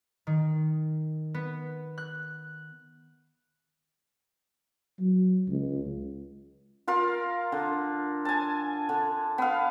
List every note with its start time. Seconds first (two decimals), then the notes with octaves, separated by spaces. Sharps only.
0.27 D#3
1.34 B3
1.98 F#6
5.00 F#3
5.49 C#2
6.88 F4 A#4 F5
7.52 D3
8.25 G#5 A5
8.89 D3
9.38 B3 F5